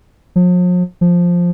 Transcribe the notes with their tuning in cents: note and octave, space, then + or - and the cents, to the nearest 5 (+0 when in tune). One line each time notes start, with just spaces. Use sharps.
F3 +45
F3 +5